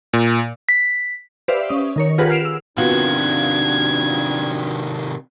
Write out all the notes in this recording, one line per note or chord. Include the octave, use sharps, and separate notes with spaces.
A#2
B6
G4 B4 C5 D5 E5 F5
C#4 D#6
D#3 A#4 C#5
F4 G4 G#4 A#4 B4 F#5
F6 C7 D7 E7 F7
E6
C3 D#3 B3 D4 F4 F#4 G#6